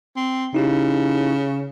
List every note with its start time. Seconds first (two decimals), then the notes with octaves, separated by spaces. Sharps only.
0.16 C4
0.55 C#3 D#4 E4 G4